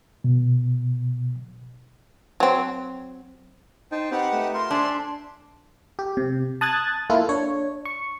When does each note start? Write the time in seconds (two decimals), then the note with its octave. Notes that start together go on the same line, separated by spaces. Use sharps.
0.24 B2
2.40 F#3 C4
3.92 D#4 C5 G5 A5
4.11 C4 D#4 G4 B4 F#5
4.33 A3
4.54 F4 A#4 C6
4.71 D4 C5 E5 G#5
5.99 G4
6.17 C3
6.61 A5 D#6 F#6 G#6 A6
7.10 A#3 E4 F4 A4
7.29 D4 C#5
7.85 C#6